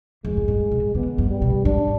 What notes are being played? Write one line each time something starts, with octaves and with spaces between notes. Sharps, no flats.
F2 G#3
G#2
G2
B2
D3 B3
G2
G3
B2
G#2 D4